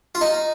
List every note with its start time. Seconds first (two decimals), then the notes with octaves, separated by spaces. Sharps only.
0.15 F4
0.21 D#4